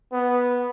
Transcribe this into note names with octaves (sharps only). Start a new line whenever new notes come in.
B3